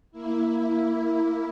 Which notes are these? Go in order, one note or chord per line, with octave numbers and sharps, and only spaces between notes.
A#3 E4